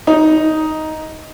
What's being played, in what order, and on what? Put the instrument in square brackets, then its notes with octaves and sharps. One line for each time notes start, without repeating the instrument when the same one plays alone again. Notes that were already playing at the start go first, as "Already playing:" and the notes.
[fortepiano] D#4